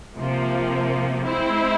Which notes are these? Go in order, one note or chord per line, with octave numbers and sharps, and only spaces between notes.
C3 F3 A#3
G#3 C4 E4